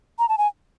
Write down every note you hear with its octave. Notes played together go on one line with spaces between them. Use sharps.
A#5
A5
G#5